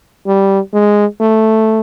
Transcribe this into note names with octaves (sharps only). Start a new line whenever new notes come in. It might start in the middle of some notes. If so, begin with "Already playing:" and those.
G3
G#3
A3